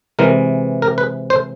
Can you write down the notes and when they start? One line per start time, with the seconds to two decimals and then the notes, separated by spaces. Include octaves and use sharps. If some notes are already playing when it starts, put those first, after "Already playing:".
0.19 C3 E3 G#3 A#4
0.82 A#4
0.98 B4
1.30 C5